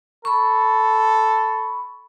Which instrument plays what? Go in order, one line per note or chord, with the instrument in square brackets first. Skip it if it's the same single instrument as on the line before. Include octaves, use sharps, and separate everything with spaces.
[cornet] A4 [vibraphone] B5 C#6